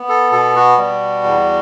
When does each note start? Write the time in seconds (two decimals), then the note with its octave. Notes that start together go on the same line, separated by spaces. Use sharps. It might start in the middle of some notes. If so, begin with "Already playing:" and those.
Already playing: B3
0.09 A4
0.32 B2 A4
0.56 F#4
0.78 G3
1.23 E2